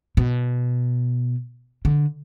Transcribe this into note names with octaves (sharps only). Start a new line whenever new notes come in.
B2
D3